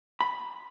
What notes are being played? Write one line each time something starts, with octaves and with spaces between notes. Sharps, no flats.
B5